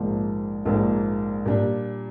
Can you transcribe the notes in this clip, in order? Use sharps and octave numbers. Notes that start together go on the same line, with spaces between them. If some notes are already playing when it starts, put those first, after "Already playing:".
Already playing: A#1 G#2 F3 A#3
A#1 G#2 F3 A#3
A#2 G3 D4 G4